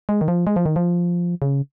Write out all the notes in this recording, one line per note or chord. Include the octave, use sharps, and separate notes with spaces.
G#3
D#3
F3
G#3
F3
D#3
F3
C#3